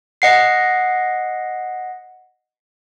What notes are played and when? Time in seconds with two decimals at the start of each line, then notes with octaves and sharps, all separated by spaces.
0.22 D#5 F#5 C7